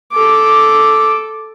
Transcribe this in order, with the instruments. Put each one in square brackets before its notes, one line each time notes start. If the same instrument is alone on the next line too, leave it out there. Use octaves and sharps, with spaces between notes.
[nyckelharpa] A4 D6